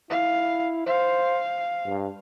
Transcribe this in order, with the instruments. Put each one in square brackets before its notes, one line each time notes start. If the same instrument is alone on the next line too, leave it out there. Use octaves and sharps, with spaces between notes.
[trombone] E4 [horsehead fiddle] F5
[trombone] C5 [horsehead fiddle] F5
[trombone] G2